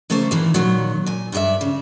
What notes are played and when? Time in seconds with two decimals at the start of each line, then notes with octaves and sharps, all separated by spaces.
0.10 C#3 A3 A#3 A4 C5
0.31 A#2 D#3 E3
0.54 A#2 D#3 F#3
1.06 A#2 G#5
1.32 G2 F4 G4 D5 E5
1.61 C#3